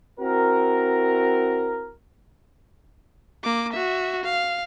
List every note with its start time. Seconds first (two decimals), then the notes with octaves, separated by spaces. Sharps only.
0.20 C4 E4 F#4 A#4
3.44 A#3 D6
3.73 F#4 E5
4.23 F5